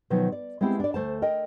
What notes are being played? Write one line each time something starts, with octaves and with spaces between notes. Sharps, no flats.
B2 D#3 F3 F#3
D5
G#3 B3 C4 E4 G4
D4 D5
D2 A3 C5 A5
A#4 D#5 G5